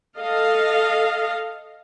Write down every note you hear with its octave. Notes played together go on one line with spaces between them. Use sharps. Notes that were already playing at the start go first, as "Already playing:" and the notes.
A4 D#5 F5